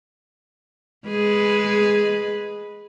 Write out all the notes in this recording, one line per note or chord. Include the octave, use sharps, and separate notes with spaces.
G#3 G#4 B4